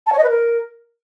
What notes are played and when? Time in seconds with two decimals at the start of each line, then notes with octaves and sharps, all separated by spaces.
0.06 A5
0.12 C#5
0.17 D#5
0.23 B4
0.29 A#4